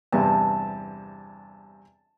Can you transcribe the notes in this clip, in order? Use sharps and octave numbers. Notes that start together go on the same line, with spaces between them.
E2 G2 C3 A5